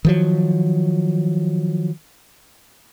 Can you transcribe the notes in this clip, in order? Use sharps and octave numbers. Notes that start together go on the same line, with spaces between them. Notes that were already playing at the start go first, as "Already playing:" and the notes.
D#3 F3 F#3